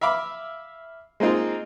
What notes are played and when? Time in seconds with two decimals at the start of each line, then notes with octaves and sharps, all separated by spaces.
0.01 E5 F5 B5 D6
1.20 G#3 A#3 C4 D#4 F4